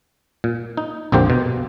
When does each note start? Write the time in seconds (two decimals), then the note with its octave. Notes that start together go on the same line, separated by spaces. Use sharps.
0.44 A#2
0.77 D#4
1.12 A#1 F2 D3 A#3 G4 C5
1.30 B2